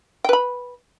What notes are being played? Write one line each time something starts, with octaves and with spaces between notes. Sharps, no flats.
B4 G5 B5